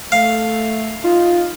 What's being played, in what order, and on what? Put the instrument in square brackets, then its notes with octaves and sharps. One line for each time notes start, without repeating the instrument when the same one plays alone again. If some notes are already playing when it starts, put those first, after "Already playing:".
[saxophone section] A3 [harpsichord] F5
[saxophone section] D#4 F4